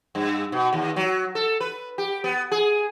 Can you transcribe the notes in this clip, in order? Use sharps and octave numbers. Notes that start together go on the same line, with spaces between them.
G2
B2
D#2
F#3
A4
B4
G4
B3
G#4